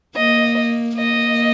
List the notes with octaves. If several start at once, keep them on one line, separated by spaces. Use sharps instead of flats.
A#3 D#5
A#3 D#5